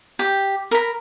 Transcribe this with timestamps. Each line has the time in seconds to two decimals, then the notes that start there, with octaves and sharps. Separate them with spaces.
0.19 G4
0.71 A#4 B5